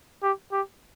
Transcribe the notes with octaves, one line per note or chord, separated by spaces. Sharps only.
G4
G4